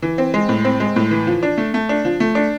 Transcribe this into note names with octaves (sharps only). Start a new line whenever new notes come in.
E3
C4
G#3
A2
C4
G#3
A2
E3
F3
D4
A3
A3
D4
F3
A3
D4